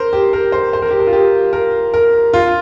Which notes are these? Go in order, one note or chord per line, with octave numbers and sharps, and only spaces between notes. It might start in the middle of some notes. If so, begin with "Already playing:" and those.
Already playing: A#4 C5
G4
A#4
C5
C5
A#4
G4
A#4
F4
G4
A#4
A#4
F4